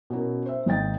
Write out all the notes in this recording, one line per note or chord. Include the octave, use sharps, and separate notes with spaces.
B2 C#4 E4 A#4
C5 E5
G#1 D#4 D#5 G5 A6